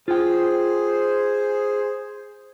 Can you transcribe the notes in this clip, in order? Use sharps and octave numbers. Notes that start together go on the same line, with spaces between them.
F4 G#4 C5 G5